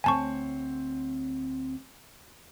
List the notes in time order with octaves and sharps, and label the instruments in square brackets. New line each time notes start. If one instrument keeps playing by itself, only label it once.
[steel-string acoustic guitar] D2 C4 C#5 [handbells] G#5 A5 C#6